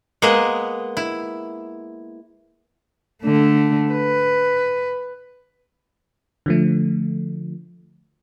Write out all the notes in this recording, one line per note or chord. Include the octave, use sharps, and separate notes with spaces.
G#3 A#3 B3 G#4 B4 D#5
E4
D3 A3
B4
D3 F3 A3